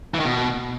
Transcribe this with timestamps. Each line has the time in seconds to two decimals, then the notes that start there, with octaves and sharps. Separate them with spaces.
0.14 E3
0.20 D#3
0.25 B2